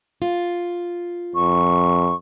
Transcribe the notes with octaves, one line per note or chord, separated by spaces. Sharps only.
F4
F2 C#6